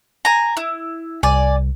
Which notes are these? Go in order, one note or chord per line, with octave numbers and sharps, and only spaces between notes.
G#5 A#5
E4
C2 D5 G#5